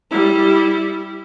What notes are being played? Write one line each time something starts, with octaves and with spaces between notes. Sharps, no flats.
G3 E4